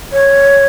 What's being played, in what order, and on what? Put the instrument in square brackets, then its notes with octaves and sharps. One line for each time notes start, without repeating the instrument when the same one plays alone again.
[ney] C#5